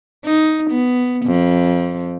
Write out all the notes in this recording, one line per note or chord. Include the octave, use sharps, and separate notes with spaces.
D#4
B3
F2